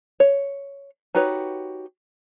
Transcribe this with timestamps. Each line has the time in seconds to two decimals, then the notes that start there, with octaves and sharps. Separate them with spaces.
0.20 C#5
1.15 D#4 F#4 G4 B4 C#5